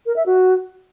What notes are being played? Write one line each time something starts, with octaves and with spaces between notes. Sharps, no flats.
A#4
E5
F#4